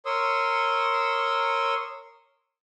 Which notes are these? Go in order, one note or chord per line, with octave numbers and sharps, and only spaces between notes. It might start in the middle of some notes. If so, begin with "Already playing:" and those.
A#4 C#5 C6 C#6 D#6 E6